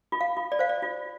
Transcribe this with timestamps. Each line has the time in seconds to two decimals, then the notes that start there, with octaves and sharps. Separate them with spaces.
0.12 F4
0.21 F5
0.37 F4
0.52 D5
0.59 C5 F5
0.69 D5
0.82 F4